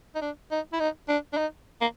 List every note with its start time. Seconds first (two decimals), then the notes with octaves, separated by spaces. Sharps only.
0.15 D#4
0.21 D4
0.51 D#4
0.73 E4
0.80 D#4
1.08 D4
1.33 D4
1.37 D#4
1.81 A#3